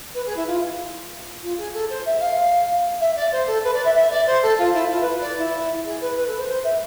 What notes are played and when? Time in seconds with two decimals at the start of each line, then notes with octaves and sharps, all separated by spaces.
0.14 B4
0.26 G#4
0.36 E4
0.47 F4
1.42 F4
1.57 G#4
1.74 A4
1.90 C5
2.06 E5
2.20 F5
3.00 E5
3.16 D5
3.32 C5
3.47 A4
3.64 B4
3.74 D5
3.85 E5
3.95 E5
4.10 D5
4.27 C5
4.43 A4
4.58 F4
4.74 E4
4.90 F4
5.01 B4
5.21 D5
5.38 E4
5.85 G#4
6.01 B4
6.17 B4
6.27 A4
6.38 C5
6.48 C5
6.64 E5